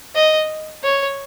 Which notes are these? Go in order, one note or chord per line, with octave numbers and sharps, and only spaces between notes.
D#5
C#5